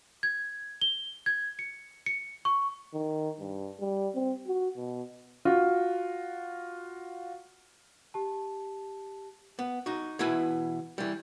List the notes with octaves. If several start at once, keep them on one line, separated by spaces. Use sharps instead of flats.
G#6
G7
G#6
C#7
C#7
C#6
D#3
G2
G3
C4
F#4
B2
F4 F#4
G4 A5
B3
D#4 F#4
B2 E3 E4 B4 G#5
E3 G3